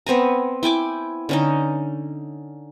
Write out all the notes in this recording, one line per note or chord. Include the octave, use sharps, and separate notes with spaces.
B3 C4 G#5 A#5
E4 G5 G#5 D6
D3 C#4 D#4